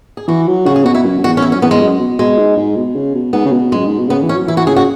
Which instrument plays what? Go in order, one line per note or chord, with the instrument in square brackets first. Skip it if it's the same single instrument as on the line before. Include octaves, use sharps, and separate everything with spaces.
[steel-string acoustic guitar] G#4
[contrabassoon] E3 [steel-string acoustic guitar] F#4
[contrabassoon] F#3
[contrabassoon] C#3 [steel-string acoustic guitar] F#4
[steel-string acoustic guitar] G#4
[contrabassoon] B2 [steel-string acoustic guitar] F#4
[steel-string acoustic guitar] E4
[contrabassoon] F#2
F#2
[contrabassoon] E2 [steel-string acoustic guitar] F#4
[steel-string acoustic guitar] C#4
[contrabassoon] E2 [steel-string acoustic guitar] E4
[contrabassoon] F#2 [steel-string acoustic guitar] C#4
[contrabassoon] E2 [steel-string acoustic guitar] B3
[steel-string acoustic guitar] G#3
[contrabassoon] F#2
B2
[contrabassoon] B2 [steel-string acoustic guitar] G#3
[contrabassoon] G#2
G#2
B2
C#3
B2
[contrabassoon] G#2 [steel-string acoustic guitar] B3
[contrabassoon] C#3
B2
[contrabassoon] F#2 [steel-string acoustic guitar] G#3
[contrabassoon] G#2
B2
[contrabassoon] C#3 [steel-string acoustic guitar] B3
[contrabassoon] E3
[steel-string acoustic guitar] C#4
[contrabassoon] F#3
[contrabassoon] E3 [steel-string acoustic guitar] E4
[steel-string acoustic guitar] F#4
[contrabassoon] C#3 [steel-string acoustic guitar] G#4
[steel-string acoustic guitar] F#4